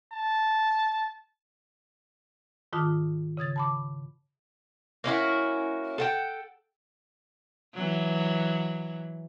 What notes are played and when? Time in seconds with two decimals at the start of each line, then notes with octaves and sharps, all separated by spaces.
0.12 A5
2.73 G#2 D#3 F4 A5 D6 D#6
3.37 C#3 D#6 G#6 A6
3.56 A5 B5 D6
5.04 A#3 C#4 E4 F#4
5.98 A4 F#5 G5
7.74 E3 F#3